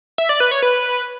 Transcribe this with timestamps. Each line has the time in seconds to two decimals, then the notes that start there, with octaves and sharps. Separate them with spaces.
0.18 E5
0.29 D5
0.40 B4
0.51 C#5
0.62 B4